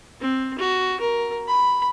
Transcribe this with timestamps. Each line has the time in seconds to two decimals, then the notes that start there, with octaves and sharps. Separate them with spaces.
0.21 C4
0.59 F#4
1.00 A#4
1.48 B5